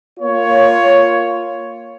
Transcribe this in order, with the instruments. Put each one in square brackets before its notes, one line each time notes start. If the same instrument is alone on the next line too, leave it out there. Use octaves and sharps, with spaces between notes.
[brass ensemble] A#3 F4 C#5